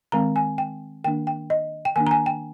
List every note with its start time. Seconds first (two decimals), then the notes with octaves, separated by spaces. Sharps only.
0.12 D#3 G#3 C4 A#5
0.36 G#5
0.58 G5
1.04 D#3 A#3 D4 G5
1.27 G5
1.50 D#5
1.85 G5
1.96 D#3 A#3 D4 G#5
2.07 A#5
2.11 G#5
2.26 G5